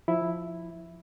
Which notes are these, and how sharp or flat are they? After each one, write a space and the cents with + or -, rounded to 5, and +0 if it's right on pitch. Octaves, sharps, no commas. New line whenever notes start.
F3 +0 E4 +0